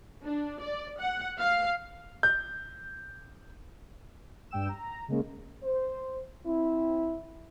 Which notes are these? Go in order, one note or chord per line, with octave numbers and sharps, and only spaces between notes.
D4
D5
F#5
F5
G6
G2 G3 G5 E6 E7
A#5
C#3 G#3 A#3 C#4
C5
C4 E4